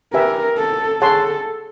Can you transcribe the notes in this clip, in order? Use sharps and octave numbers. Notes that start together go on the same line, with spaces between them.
G4 A#4 B4 E5 G#5
A4
G#4 A4 C#5 F#5 A5 C6